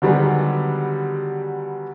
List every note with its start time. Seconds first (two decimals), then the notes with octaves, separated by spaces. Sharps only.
0.02 D3 D#3 F#3 G3 B3 G#4